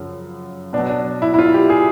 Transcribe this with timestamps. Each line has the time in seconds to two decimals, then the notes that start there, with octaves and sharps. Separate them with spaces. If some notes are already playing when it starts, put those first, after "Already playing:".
Already playing: F#2 C#3 F3
0.73 B2 D4
0.78 F#3
0.89 D4
1.22 E4
1.34 E4
1.39 F4
1.54 G4
1.70 G#4